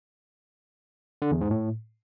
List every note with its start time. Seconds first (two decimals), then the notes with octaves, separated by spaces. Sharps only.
1.22 D3
1.31 E2
1.41 G#2
1.51 A2